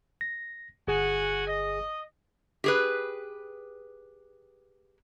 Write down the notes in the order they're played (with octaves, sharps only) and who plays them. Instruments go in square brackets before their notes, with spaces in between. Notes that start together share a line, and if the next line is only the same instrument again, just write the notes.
[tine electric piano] A#6
[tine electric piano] G1 G#4 [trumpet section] F#4 F#5 G#5
[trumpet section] D#5
[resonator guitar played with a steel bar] G4 G#4 B4